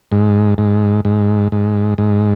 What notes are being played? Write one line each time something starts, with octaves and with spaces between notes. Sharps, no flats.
G#2
G#2
G#2
G#2
G#2